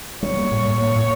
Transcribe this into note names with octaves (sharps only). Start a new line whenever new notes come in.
G3 C#5
A#3
A2
A2
A#3 C#5
A2